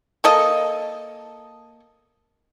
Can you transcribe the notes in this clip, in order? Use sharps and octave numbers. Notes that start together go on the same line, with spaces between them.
A#3 A4 D#5